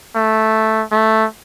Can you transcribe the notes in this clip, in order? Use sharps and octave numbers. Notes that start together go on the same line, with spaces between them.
A3
A3